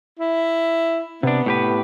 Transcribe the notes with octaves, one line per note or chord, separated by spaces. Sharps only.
E4
C3 B3 D4
A2 G4 B4